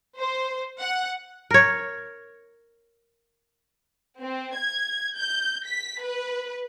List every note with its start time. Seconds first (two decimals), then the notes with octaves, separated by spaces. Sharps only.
0.18 C5
0.79 F#5
1.51 A#4 C#5
4.21 C4
4.57 G#6
5.17 G6
5.66 B6
6.03 B4